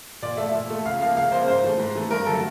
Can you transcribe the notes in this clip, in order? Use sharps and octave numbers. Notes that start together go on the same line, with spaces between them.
A#2 D5
A3 E5
F3
A#2
F3 A3
C#2 F5
C#3 F3 A#3 F5
C#2 F5
C#3 F3 A#3 C5
G#2 C5
E3 A3
G#2
E3 A3
G2 A#4
D3 F#3 A3 A4